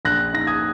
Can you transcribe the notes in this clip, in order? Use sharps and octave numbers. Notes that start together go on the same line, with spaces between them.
A#1 F#6 A#6
D#4 A#6
D#6 G#6